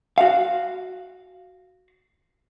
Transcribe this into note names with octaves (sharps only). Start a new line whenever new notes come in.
F#4 F5